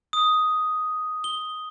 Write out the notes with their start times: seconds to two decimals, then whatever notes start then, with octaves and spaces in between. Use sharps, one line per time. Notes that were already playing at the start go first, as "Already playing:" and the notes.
0.13 D#6
1.24 G7